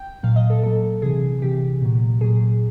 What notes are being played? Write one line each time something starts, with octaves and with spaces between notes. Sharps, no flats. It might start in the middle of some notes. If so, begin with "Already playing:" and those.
Already playing: G5
A#2 F#3 F5
D#5
A4
A#2 F#3 A4
C3 E3 G#4
C3 E3 G4
A#2 F#3
A#2 F#3 G#4